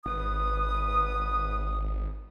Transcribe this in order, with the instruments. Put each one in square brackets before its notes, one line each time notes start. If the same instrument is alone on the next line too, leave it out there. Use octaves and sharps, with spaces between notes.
[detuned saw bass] G#1 [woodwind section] B3 B4 D#6